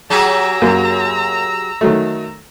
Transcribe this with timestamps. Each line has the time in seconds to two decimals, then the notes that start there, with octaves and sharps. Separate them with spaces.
0.10 F#3 G4 G#4 A#5 E6
0.62 F#2 A#3
1.81 D#3 F#3 A3